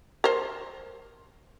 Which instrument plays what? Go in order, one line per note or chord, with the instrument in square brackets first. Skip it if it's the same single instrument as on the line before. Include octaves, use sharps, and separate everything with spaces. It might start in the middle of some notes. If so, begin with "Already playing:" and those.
[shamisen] A#4 C5